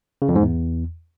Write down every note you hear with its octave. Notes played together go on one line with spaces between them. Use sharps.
C#3
F2
G#2
E2